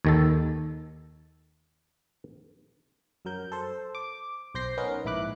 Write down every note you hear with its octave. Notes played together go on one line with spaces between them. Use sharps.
D#2 D#3 A4
F#2 F#3 A#4 G6
A4 C5
D6
B1 C5 G6 A#6 C7
B3 C#4 D#4 A#4 B4
A#1 G#2 E4 B5 D6 F#6